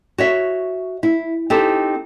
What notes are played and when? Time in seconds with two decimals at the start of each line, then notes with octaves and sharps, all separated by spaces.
0.18 F#4 C#5 E5
1.03 E4
1.50 C4 D#4 G4 A4